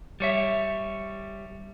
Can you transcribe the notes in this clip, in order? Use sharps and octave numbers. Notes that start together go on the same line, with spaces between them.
G3 C#5 E5